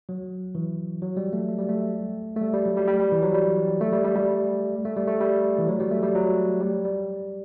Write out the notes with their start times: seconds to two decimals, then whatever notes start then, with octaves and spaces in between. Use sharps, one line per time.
0.09 F#3
0.55 E3
1.02 F#3
1.17 G3
1.33 A3
1.48 A3
1.59 G3
1.69 A3
2.36 A3
2.41 G3
2.54 G3
2.65 F#3
2.77 G3
2.88 G3
2.99 G3
3.12 E3
3.23 F#3
3.34 G3
3.81 A3
3.92 G3
4.05 G3
4.16 G3
4.85 A3
4.96 G3
5.07 A3
5.21 G3
5.58 E3
5.68 F#3
5.80 G3
5.91 A3
6.03 G3
6.15 F#3
6.61 G3
6.85 G3